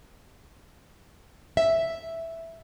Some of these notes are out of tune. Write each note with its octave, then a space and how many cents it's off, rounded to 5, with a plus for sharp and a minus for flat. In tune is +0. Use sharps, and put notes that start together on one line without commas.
E5 +0